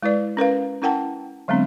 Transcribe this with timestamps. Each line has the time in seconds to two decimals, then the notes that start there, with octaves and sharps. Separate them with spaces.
0.03 G#3 E4 B4 D5
0.37 C#4 A#4 B4 F5
0.82 C#4 E4 A#4 F#5 G5 A5
1.48 D3 F#3 G#3 B3 C4 D4